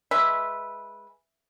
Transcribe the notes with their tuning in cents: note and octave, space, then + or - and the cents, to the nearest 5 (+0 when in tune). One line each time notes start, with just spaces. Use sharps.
G#3 +0 B4 -10 E5 +0